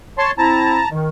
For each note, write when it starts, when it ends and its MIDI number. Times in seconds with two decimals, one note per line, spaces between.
0.18 0.31 73
0.18 0.31 81
0.18 0.31 84
0.38 0.80 60
0.38 0.80 64
0.38 0.89 81
0.38 0.89 82
0.90 1.08 51